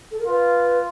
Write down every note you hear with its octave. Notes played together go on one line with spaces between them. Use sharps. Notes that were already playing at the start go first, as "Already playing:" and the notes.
A4
A#4
F4 B4